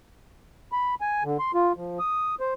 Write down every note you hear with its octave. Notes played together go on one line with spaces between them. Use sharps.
B5
G#5
D3
C6
F4
F3
D#6
C5